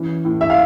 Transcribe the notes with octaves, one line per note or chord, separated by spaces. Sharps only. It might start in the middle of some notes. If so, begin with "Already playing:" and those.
Already playing: E3 C#4
A2
E5
F5